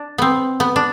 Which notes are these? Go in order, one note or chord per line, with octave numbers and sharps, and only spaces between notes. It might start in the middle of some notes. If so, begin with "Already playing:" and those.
Already playing: D4
B3 C4
B3
D4